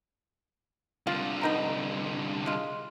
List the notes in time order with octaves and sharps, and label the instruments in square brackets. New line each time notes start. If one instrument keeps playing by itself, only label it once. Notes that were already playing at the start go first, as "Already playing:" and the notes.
[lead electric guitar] C2 D3 [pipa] F4
[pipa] B3 D#4 A#5
G#3 F4